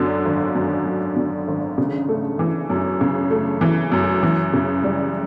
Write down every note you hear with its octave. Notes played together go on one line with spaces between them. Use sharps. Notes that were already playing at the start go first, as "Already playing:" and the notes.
Already playing: F#2 D3 F#3
G#1
F#2
F#3
D3
G#1
C#3
A3
E3
F#2
C#3
A3
E3
F#2
E3
C#3
G3